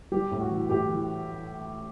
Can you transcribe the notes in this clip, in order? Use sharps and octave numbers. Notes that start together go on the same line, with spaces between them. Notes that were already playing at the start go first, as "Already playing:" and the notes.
G3 G4
A2
F#4
E3
A2 G4
E3